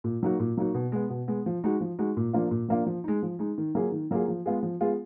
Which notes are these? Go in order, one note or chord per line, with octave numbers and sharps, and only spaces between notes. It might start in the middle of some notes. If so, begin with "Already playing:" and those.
A#2
F#3 A#3 D#4 F#4
A#2
F#3 A#3 D#4 F#4
B2
G#3 B3
B2
G#3 B3
F3
G#3 D#4 F#4
F3
G#3 D#4 F#4
A#2
F3 A#3 D4 F4
A#2
F3 A#3 D4 F4
F3
G#3 D#4
F3
G#3 D#4
D#3
F#3 A#3 F4 G#4
D#3
F#3 A#3 F4 G#4
F3
G#3 B3 F4 G#4
F3
G#3 B3 F4 G#4